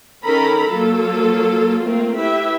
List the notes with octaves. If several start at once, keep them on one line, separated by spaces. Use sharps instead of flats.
D#3 C#4 A4 A#4 A#5 B5
F#3 A#3 F4 A4
A3 A#3 C4 F4 A#4
E4 G4 B4 E5